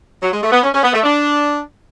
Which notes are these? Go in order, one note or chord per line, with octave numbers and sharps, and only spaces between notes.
F#3
G#3
A3
B3
C#4
C#4
B3
A3
D4